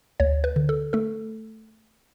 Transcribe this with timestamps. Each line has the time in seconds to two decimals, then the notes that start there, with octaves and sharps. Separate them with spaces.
0.20 D2 C#5
0.44 B4
0.56 D3
0.69 A4
0.93 A3 A4